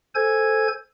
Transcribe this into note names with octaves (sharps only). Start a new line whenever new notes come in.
A4 C5 G#5 G#6